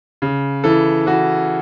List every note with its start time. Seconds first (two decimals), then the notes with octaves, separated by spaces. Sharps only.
0.22 C#3
0.64 E3 A4
1.06 E3 F#4